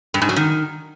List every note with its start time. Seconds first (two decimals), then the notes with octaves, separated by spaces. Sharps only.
0.14 G2
0.22 G#2
0.29 F#3
0.36 D#3